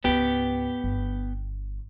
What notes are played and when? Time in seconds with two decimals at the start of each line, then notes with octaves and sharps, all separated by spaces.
0.04 C#2 G#2 B3 G4
0.84 G1